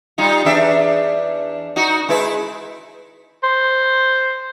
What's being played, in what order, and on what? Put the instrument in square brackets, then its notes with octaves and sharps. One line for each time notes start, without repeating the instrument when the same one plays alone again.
[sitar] G3 D#4 F4
E2 D4 E5
D#4 F#4
G#3 E4 B4
[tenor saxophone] C5